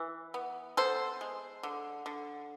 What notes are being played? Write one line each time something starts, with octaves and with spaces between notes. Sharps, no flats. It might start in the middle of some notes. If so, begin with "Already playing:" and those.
Already playing: E3
B3
B3 A4 C5
G#3
D3
D3